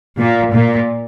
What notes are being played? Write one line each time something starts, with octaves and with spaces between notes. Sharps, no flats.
A#2
A#2